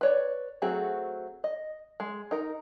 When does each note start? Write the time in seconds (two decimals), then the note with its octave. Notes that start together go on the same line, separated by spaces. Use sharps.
0.01 B4 C#5 D5
0.62 F#3 A3 C4 F#4 G#4
1.44 D#5
2.00 G#3
2.31 D#4 A#4